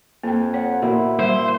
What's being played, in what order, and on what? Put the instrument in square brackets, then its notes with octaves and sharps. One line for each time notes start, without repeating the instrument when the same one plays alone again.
[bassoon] F2 [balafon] A#3 G5
[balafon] C#5 [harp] F#5
[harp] A#2 [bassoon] E4 [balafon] F#4
[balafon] G3 [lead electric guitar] C5